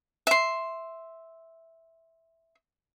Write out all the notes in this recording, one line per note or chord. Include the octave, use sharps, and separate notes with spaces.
E5 C6